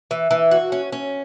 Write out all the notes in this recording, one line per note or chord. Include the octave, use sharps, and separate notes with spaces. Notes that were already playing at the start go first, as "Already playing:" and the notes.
E3
E3
F#4
C#4
C#4